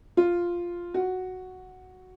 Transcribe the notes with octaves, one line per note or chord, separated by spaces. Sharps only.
F4
F#4